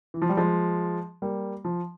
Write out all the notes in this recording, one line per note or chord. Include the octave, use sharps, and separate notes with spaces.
E3
F3
G3
F3 G#3
G3 A#3
F3